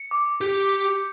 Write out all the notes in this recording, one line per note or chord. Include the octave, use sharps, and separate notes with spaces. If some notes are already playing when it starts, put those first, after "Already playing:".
Already playing: C#7
D6
G4 G6